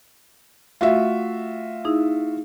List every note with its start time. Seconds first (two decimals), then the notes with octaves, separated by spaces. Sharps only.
0.81 A3 F4 F#4 E5 F5
1.84 D#4 E4 G#4